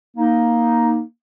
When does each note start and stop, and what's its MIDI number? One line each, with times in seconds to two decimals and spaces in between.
0.17 1.01 58
0.17 1.01 63